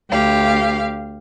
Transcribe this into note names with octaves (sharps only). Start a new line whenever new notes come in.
D2 G4 F5